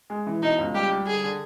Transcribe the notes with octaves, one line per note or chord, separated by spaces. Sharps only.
G#3
E3
B2 D#4
C#2
G3 G4
G3
D3 G#4
D3